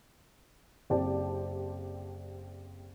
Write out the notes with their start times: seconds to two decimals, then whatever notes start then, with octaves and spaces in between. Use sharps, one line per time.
0.90 F#1 C4 G4 D5 A5